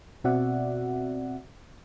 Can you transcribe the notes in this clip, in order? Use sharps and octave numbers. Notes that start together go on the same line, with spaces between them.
B2 C4 F#4 D5 E5 F#5